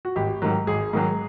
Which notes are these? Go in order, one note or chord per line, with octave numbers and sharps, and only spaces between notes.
F#4
G#1 G4
G#2 D#3 F#3
G#1 G#4
G#2 D#3 F#3